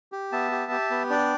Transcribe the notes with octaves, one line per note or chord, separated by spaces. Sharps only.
G4
B3 E5 A5
G4
G4
B3
D4 D5 G5